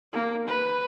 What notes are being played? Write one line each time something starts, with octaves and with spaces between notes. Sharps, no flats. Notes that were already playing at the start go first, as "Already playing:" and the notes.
A#3
B4